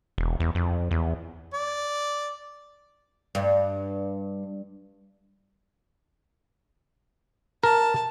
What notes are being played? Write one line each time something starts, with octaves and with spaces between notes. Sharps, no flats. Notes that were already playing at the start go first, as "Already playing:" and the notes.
E1
E2
F2
E2
D5
G2
A#4 A5